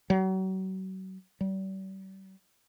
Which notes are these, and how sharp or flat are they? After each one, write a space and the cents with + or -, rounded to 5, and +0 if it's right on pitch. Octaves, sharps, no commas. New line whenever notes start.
F#3 +35
G3 -40